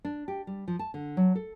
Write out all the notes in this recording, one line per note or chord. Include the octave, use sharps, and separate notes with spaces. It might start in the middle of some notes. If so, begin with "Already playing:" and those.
D4
G4
G3
F3
A5
D3
F#3
A4